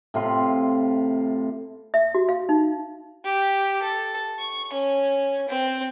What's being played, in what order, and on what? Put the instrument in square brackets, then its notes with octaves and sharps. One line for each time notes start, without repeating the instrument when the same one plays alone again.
[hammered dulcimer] A2 C3 F4
[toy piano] E5
F#4
F5
D#4
[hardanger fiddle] G4
A4
C#6
C#4
C4